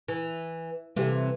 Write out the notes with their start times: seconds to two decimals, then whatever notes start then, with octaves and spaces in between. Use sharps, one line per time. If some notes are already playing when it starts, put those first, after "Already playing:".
0.08 E3
0.96 C3 E3 G3 G4 A4